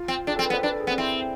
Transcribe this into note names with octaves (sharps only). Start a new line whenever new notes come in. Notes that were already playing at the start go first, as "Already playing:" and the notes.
Already playing: F4
C4
D4 G#4
C4 A4
B4
B3
C5
D4 B4
A4
G#4
B3 C4
C4 E4